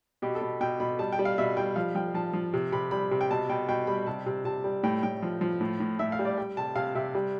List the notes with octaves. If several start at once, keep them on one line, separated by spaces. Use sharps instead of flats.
B2 G4
A4
B2
B2 G5
B2 B5
G3 A5
G5
G3
F5
B2 E5
G3 G5
F3 F5
F3 G5
F3 A5
F3
C3
C3 B5
G3 B5
C3
G5
B2 A5
B2 G5
B2 G5
G3 B5
C3 A5
C3
C3 A5
G3
A2 G5
A2 G5
F3
F3
A2
A2
A2 E5
F5
G3
D5
G3 G5
C3 A5
C3 F5
C3 E5
G3